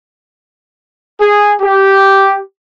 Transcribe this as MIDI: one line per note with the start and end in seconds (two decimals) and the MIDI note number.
1.20 1.54 68
1.61 2.40 67